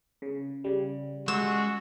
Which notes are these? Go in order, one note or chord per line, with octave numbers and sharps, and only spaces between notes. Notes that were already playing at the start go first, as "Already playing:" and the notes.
C#3
C#3 G3
G#3 F#4 E6